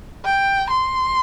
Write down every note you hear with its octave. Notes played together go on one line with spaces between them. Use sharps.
G5
C6